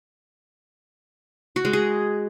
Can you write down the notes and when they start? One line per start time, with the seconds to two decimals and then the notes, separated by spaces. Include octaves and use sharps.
1.56 F#4
1.65 G#3
1.73 G#4